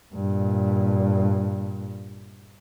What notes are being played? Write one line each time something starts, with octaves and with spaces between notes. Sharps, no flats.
G2 A#2